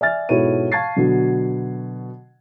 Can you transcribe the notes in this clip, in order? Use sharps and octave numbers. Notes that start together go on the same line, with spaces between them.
D5 E5 G#5 F6 A6
G#2 B2 E4 A4 C#5 D#7
F5 A5 C#6 G#6 A6 C7
B2 D3 F#3